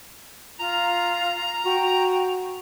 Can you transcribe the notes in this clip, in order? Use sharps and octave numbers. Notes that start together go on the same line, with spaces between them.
F4 A#5
F#4 G5